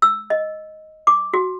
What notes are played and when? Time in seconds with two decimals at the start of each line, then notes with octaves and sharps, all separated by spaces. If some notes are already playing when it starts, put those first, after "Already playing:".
0.02 E6
0.30 D#5
1.07 D6
1.34 F#4